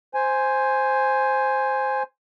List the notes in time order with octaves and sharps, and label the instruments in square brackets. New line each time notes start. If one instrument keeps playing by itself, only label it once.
[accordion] C5 G#5